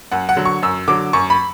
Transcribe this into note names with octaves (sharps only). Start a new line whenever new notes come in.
F#2 F#5
F#5
D3 F#3
C#6
F#2 E6
D3 F#3 D6
F#2 C#6
B5